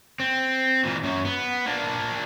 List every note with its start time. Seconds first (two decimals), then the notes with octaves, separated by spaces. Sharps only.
0.20 C4
0.85 A#2 E3
1.03 F#2 F#3
1.25 B3
1.66 A#3 D4